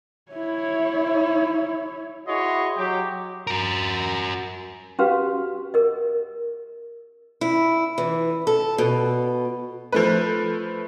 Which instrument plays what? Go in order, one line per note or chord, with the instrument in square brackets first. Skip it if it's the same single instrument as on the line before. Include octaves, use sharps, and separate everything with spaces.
[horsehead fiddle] E4 C#5
[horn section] E4 F#4 G#4 C#5 D#5 C6
F#3 G4
[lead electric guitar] F#4 A#4
[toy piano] C#4 F#4 G4 B4 F5
A#4 D#5
[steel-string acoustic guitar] E4
E3
A4
B2
[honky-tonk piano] F3 A3 B4